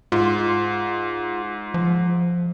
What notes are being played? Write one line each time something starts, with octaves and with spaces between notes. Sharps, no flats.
G#2 F4
F3